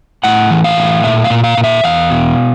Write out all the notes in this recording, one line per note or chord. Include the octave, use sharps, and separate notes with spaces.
A2 F#5
E3
F5
A2
A#2 E5
F5
A#2
F5
A#2
E5
E2 F5
B2